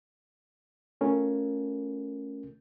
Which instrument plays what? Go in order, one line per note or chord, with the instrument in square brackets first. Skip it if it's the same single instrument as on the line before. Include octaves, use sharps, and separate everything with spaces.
[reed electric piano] A3 C#4 F4 A4 A#4